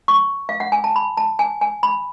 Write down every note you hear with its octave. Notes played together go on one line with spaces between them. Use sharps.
C#6
F5
F#5
G#5
A5
B5
A5
G#5
G#5
B5